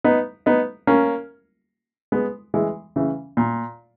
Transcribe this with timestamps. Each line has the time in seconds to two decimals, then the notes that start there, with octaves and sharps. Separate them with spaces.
0.04 B3 D#4
0.46 B3 D#4
0.87 A#3 C#4
2.12 G#3 B3
2.54 E3 G#3
2.96 C#3 E3
3.37 A#2